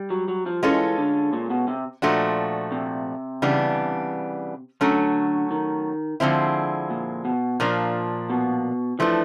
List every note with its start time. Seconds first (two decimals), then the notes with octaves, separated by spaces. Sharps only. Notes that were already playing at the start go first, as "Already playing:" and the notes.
Already playing: G3
0.10 F#3
0.28 F#3
0.46 F3
0.63 E3 G#3 C#4 F4 A4
0.98 D3
1.33 A#2
1.50 B2
1.68 C3
2.02 A#2 F3 A3 D4 F#4
2.72 C3
3.42 C#3 E3 G3 B3 D4
4.81 D3 F#3 A3 C#4
5.51 D#3
6.20 D3 F3 G#3 C4 E4
6.90 A#2
7.25 B2
7.60 A#2 F3 A#3 D4
8.30 B2
8.99 E3 F3 A3 D4